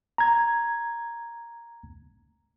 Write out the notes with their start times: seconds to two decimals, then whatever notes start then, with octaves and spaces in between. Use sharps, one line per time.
0.18 A#5 G#6